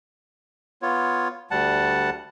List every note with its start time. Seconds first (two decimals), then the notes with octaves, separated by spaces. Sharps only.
0.82 B3 F4 C#5
1.51 D2 G3 F#5 A5